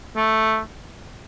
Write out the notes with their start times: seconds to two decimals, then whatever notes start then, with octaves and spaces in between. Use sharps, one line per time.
0.16 A3